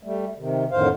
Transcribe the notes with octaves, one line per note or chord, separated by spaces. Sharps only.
G3 A3
C3 D#3
F2 A2 D3 D#3 C5 F5